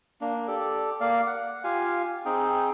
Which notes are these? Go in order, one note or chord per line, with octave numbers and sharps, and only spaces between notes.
A#3 D4
G4 A4 D5
A#3 D5 F5
F#5
F4 G4 F5 G#5
C4 D#4 G#4 G5